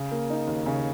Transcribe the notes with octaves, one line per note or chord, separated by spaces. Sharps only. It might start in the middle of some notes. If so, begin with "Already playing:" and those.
Already playing: C#3
A#3
D#4
D#2
C#3